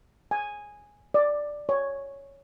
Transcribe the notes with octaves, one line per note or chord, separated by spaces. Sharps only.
G#5
D5
C#5